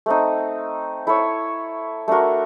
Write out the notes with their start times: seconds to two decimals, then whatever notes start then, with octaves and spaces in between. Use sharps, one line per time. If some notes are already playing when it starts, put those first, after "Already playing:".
0.06 A3 C4 D#4
1.07 E4 A4 C#5
2.08 A3 D4 F#4 A#4